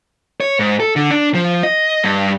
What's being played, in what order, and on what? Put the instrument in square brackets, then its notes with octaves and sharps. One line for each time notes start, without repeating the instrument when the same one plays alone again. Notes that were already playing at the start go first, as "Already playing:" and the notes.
[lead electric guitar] C#5
G#2
A4
D3
D4
F3
D#5
G2